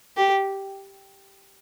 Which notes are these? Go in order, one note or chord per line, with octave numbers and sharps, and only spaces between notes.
G4